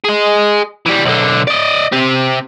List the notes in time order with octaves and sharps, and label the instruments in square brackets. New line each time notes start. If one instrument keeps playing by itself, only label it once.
[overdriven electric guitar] G#4 D#5
E3 G3
B1 D3
D5 D#5
C4 G4